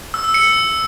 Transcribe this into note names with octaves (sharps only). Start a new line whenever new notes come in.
E6
E6
C#7